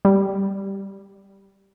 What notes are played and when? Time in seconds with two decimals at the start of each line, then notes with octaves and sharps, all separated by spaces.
0.05 G3